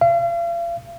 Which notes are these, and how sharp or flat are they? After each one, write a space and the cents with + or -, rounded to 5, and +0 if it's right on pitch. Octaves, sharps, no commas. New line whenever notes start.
F5 -40